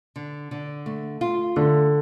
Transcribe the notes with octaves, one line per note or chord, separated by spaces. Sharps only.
D3
D3
A3
F4
D3 A3